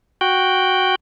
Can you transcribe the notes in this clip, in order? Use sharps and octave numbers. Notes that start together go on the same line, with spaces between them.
F#4 G5